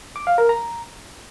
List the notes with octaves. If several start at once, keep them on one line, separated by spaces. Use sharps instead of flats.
D6
F5
A#4
A#5